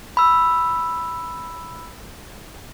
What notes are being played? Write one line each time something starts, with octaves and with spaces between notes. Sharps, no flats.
B5 E6